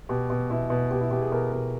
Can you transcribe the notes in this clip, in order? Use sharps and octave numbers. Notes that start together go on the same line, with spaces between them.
B2 G4
B2
B2 E4
B2
B2 G4
E4
B2 G4
G#4
B2 A#4
B2